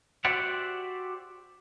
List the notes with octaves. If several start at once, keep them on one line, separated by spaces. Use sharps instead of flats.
F#4 G4 C5 D5 E5 F#5